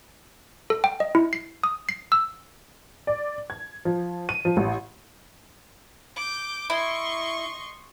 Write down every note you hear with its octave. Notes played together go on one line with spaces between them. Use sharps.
A4
G5
D#5
E4
C7
D#6
C7
E6
D5
G#6
F3
D#7
F3
A1
D6 G6
E4 D#5 C6 C#6